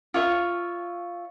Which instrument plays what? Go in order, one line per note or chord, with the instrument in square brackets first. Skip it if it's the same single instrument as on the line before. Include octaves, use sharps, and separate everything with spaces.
[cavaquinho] F4 C#5 E5